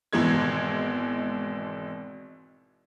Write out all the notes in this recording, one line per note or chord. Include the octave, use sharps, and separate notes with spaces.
G#1 B2 E3 G#3 G#6